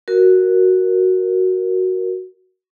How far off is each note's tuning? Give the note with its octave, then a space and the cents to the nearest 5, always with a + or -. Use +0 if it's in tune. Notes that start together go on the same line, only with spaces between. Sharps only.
F#4 +0 A#4 +0